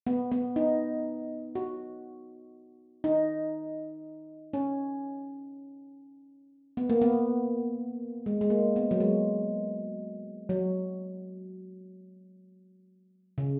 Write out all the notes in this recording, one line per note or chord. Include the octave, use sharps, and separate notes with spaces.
B3
B3
D#4
F#4
D#4
C#4
B3
A#3
B3
G#3
G#3
A#3
B3
F#3
G#3
F#3
C#3